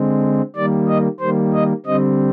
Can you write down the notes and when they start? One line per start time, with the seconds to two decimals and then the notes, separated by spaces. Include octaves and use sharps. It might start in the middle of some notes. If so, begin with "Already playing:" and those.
Already playing: D3 G#3 C4
0.56 D#3 G3 A#3 D5
0.88 D#5
1.20 D#3 G3 A#3 C5
1.54 D#5
1.86 D3 G3 C4 D#5